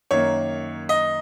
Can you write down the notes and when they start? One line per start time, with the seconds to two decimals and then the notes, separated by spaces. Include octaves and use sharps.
0.11 F#2 D#3 A#3 C#5
0.89 D#5